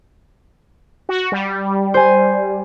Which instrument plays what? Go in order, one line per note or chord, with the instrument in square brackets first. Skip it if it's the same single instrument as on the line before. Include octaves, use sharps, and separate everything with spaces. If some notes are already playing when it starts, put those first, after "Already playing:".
[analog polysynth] F#4
G3
[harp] C5 G#5